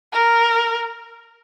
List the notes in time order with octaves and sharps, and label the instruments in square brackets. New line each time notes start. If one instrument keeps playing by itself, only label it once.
[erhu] A#4